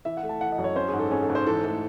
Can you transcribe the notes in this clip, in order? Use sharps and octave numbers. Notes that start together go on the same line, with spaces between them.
E3 E5
F#5
A3
A5
E3 F#5
D#5
F#2
C#5
C#4 C5
G#4
G#2
A4
C#4 G#4
A4
G#2
C5
E3 A4
A3 A4